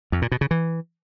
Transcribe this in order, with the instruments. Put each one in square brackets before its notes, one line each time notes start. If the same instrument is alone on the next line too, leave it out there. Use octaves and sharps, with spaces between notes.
[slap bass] F2
A#2
B2
C#3
E3